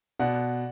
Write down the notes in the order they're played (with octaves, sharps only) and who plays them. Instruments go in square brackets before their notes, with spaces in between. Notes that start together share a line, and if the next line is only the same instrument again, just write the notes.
[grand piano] B2 [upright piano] D5 F#5